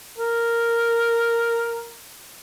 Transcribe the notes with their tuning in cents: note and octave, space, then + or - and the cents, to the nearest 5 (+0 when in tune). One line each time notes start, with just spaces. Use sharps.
A#4 -5